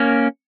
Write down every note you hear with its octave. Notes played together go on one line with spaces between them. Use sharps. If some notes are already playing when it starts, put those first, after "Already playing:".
Already playing: A#3 C#4 A#4